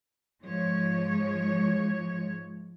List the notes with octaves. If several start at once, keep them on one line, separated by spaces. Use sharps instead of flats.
G#2 F3 G#3 C#5